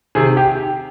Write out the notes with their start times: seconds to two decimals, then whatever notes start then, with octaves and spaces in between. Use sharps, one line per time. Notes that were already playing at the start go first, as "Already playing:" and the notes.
0.15 C3 D#3 G#4
0.37 G4